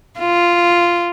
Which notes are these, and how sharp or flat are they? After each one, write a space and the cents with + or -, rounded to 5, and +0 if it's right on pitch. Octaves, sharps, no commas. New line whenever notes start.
F4 -5